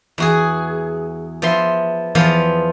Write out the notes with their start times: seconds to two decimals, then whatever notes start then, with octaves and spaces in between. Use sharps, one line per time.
0.18 E2 F#4 G#4
1.42 F3 B3 E5 C6
2.15 E2 F3 B3 F4 F5